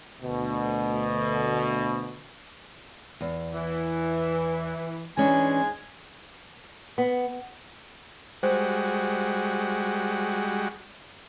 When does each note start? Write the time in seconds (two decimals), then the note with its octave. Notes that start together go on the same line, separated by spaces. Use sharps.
0.23 D2 B2
3.21 E2
3.54 E3
5.17 G#2 E3 G#3 C#4 D4 G#5
6.98 B3
8.43 G3 G#3 F#4 C5